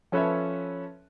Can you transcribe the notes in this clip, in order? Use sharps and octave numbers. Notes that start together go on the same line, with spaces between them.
F3 C#4 A4 B4 C#5 E5